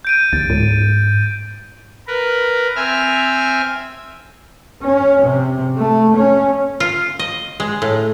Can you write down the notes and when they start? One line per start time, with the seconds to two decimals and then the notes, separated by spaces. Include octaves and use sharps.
0.05 G6 D7 D#7
0.33 D2 A6
0.50 G#2
2.07 A#4 B4
2.76 C4 E5 G#5 F6
4.81 C#4
5.21 C3
5.77 A3
6.16 C#4
6.80 F4
7.19 D#5
7.60 G#3
7.82 A2